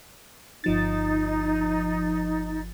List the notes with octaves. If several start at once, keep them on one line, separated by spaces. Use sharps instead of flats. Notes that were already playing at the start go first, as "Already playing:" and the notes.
G1 F3 D#4 A6